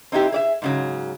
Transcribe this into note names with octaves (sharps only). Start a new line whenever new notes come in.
C4 D#4 E4 G4
G#4 D5 E5
G#2 C#3 F#3